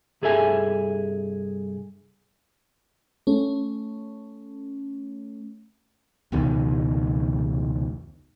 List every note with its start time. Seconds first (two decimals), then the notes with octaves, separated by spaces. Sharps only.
0.22 C2 G2 G#4 A4 E5 G#5
3.27 A3 C#4
6.32 F1 C#2 B2 D#3